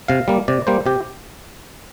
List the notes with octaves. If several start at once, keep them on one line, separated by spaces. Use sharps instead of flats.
C3 F5
G3 A#3
C3 D5
G3 A#3 C5
C3 G4